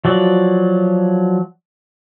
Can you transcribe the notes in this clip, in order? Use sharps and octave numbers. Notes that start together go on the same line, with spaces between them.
F3 F#3 D5